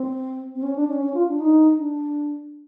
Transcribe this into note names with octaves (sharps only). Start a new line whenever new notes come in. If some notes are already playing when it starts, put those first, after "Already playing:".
Already playing: C4
C4
C#4
D4
C#4
C#4
F4
D4
D#4
D4